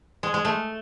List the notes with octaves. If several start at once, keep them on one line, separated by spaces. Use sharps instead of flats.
G#3
G#3
A3